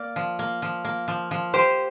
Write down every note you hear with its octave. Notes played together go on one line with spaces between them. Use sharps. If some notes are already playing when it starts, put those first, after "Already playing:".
Already playing: A#3 D5
F3
A#3
F3
A#3
F3
F3
G4 C5